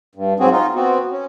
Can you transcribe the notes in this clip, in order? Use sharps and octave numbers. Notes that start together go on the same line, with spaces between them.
G2
G#2 F#3 C4 F#4 G#4
D#4 F4
B3 C4 F#4
C#4